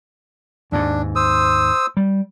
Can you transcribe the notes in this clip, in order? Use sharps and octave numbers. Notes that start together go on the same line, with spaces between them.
D#2 G#2 D4
C5 D#6 E6
G3